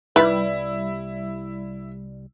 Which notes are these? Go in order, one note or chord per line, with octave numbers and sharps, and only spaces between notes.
C2 G3 E4 B4